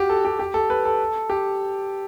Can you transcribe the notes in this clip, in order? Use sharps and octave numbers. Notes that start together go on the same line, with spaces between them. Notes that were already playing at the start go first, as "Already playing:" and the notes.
Already playing: F#4 G4
A4
G4
G4
A4
B4
A4
G4